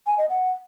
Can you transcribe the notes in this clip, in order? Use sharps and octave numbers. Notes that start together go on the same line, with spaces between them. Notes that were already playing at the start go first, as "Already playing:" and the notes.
G#5
D#5
F#5